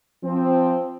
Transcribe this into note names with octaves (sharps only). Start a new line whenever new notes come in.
F3 C4